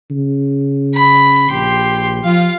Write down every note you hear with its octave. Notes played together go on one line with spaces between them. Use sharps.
C#3
B5
A#1 G4 C6
F3 F4 F5